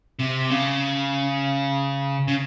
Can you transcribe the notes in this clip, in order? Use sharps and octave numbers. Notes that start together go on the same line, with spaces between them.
C3
C#3
C#3